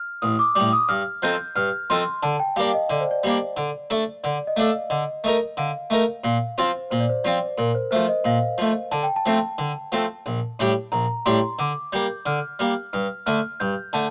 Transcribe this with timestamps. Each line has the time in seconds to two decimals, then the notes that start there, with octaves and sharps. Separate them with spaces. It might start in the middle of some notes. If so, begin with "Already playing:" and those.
Already playing: F6
0.22 A1 D#6
0.39 D6
0.55 A2 G3 D6
0.73 D#6
0.89 G2 F6
1.22 F3 C4 D#4 A4 G6
1.56 G2 F6
1.90 F3 C4 D#4 A4 C6
2.23 D3 A5
2.40 G5
2.56 G3 A#3 D4 F5
2.74 D#5
2.90 D3 D5
3.00 C5
3.11 D5
3.23 G3 A#3 D4
3.57 D3
3.90 A3 D4 A4
4.23 D3 D5
4.47 D#5
4.57 A3 D4 A4 F5
4.90 D3 D#5
5.24 A3 D#4 A#4
5.57 D3 F5
5.90 A3 D#4 A#4
6.24 A#2 F5
6.58 F3 C4 F4 C5
6.91 A#2 C5
7.00 D5
7.09 C5
7.24 F3 C4 F4 D5
7.58 A#2 A#4
7.75 C5
7.91 F3 A3 C5
8.08 D#5
8.25 A#2 F5
8.58 F3 A3
8.91 D3 A5
9.03 G5
9.16 A5
9.26 F3 A3 C4
9.58 D3
9.92 F3 A3 C4
10.26 A#1
10.59 A2 G3 D4 G4
10.92 A#1 A#5
11.26 A2 G3 D4 G4 C6
11.59 D3 D6
11.93 G3 A#3 G6
12.26 D3 F6
12.59 G3 A#3 F6
12.93 G2 F6
13.26 D3 A3 F6
13.60 G2 G6
13.93 D3 A3 A5